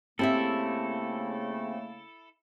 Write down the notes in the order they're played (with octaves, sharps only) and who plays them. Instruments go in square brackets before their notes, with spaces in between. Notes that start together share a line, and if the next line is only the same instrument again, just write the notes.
[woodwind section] C#3 A3 A#3 [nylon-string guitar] C4 G4 E5 [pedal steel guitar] E4 A4